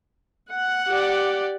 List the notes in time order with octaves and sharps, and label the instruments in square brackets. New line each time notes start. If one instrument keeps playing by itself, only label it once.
[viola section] F#5
[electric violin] G4 D5